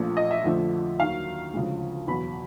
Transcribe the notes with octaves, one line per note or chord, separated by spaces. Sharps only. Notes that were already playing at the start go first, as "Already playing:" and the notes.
Already playing: A#1 A#2 F3 A3
D#5
E5
F2 D3 F3 A3
D#2 D#3 F#3 F5
D2 C#3 F3 G#3
E2 B2 F#3 B5